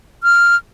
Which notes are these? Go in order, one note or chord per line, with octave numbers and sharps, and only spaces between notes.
F6